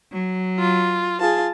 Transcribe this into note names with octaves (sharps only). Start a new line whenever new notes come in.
F#3
F4
F4 G#4 A5